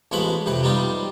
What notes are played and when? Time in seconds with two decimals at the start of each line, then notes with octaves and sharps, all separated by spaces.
0.11 A1 F3 G#3 B3 B4 B5
0.46 F2 C3 B4
0.63 G3 B3 D#4 F4